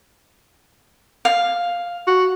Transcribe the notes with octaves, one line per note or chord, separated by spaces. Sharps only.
F5
F#4